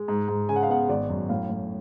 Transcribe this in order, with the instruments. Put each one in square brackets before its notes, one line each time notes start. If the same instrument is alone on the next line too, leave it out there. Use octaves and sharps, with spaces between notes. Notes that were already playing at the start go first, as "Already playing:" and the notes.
Already playing: [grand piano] G#3
G#2
G#2
C#3 G#5
F#5
F5
B3 F#5
G#1 D5
F#2
A2 F5
A2